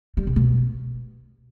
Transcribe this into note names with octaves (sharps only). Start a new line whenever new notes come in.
G3
C3
B2